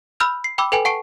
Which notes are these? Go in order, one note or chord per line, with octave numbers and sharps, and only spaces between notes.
B5 E6 F6 G6 F7
C7
G5 B5 D6 E6
A4 B4 G5 G#5
F#5 A5 C#6 C7 D7